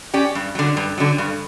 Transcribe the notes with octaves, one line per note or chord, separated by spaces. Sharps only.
C#4 G4 D5
G2
D3 F#3
G2
D3 F#3
G2